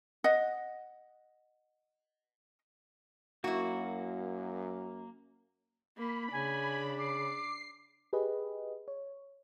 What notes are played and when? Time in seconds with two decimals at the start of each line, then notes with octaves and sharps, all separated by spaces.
0.24 D#5 F#5
3.44 F#2 A#3 E4 F#4
5.97 A#3 B5
6.32 C#3 D4 G#5
6.98 D6 C7
8.13 G4 G#4 B4 D#5
8.88 C#5